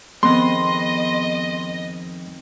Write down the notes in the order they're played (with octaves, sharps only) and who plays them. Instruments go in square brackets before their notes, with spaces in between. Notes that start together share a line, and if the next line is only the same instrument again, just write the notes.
[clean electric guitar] F2 G#3 [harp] D#3 B3 C4 [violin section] D#5 [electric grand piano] C6